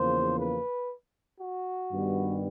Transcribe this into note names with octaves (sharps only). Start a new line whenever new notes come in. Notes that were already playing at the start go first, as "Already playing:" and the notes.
Already playing: E2 C#3 F3 A#3 C5
B4
F#4
G2 D#3 G3 B3